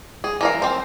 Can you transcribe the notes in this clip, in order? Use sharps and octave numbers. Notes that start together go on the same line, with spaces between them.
G#4
E3 A#4 F5
C4 C5